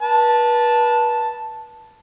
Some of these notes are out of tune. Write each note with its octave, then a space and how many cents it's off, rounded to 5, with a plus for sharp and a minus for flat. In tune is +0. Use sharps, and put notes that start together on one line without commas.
B4 -35 A5 +0